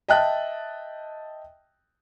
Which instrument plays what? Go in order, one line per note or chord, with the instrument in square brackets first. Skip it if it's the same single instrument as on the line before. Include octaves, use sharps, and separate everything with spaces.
[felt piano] D#5 E5 G5 A5 F#6